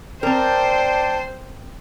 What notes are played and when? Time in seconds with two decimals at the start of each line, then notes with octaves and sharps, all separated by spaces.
0.23 C4 A#4 C5 D5 G5 A5